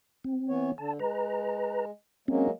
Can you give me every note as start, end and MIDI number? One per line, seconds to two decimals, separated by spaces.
0.24 0.72 60
0.49 0.70 52
0.49 0.70 59
0.49 0.70 73
0.78 0.98 50
0.78 0.93 81
0.99 1.91 56
0.99 1.85 71
0.99 1.85 82
2.28 2.50 54
2.28 2.50 56
2.28 2.50 58
2.28 2.47 60
2.28 2.47 61